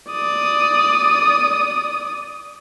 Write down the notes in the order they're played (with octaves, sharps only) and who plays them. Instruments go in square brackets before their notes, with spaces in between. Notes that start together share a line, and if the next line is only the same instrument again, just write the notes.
[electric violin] D5 D#6